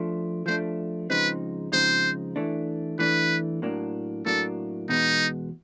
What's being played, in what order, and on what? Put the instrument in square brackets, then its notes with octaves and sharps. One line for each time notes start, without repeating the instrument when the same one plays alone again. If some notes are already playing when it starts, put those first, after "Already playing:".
Already playing: [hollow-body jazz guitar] F3 A3 D4
[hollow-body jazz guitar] F3 A3 D4 [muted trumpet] C5
[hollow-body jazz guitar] C#3 F3 G#3 C4 D#4 [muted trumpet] B4
[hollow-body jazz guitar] C#3 F3 G#3 C4 D#4 [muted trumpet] C5
[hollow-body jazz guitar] E3 A3 D4
[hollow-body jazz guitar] E3 A3 D4 [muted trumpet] B4
[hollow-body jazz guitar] A2 F#3 A#3 D4
[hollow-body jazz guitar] A2 F#3 A#3 D4 [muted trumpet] A4
[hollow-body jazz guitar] E2 B2 G#3 B3 [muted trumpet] D#4